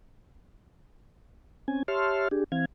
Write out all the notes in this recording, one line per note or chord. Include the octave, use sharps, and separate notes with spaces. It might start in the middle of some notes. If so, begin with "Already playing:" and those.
C4 C#4 G#5
G4 C#5 E5 A5 C6 F6
D4 G4 G#4
E3 C4 F5 G#6